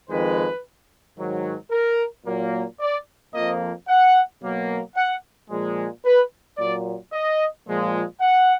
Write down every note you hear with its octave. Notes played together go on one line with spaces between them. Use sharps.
F2 D#3 G#3 B4
G#2 D#3 F#3
A#4
A#2 F#3 A#3
D5
F2 F3 A#3 D#5
F#5
B2 F#3 A#3
F#5
A#2 F3 G#3
B4
A#2 F#3 A#3 D5
D#5
A#2 F3 G#3
F#5